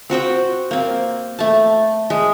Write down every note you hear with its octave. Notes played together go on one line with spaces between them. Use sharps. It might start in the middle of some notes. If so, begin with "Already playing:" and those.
C4 F#4 C5 G5
A#3 C4
A3 A5
G#3